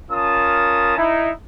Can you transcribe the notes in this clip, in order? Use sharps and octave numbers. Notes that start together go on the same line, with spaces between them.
C#4 F4 A#4 A5 D#6
D#4 E4